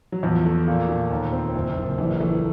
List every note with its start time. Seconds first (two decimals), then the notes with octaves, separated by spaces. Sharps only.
0.12 F#3
0.23 E2 F3
0.45 A3
0.68 A#2
0.89 A#2
1.11 D#2
1.32 C4
1.54 F#1
1.77 F#1
1.98 A#1 E3
2.20 E3 A3